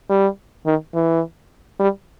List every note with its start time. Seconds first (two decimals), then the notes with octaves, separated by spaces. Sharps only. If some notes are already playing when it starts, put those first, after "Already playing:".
0.09 G3
0.66 D#3
0.94 E3
1.79 G3